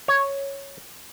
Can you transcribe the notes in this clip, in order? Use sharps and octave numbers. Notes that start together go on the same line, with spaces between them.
C#5